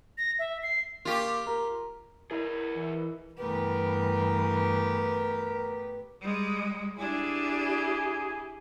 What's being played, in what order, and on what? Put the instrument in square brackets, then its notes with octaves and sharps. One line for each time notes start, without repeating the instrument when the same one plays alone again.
[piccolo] A#6
E5
C7
[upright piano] A#3 F5 C#6 [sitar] F4 G4
[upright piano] A#4 A#5
[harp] E4 [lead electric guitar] G#4 B4 [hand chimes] A#4 D#5
[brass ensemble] E3
[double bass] G2 E3 [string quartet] A3 B3 G4 [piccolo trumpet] A#4 [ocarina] B4
[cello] G3 G#3
[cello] D4 [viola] E4 G4 [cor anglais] G#4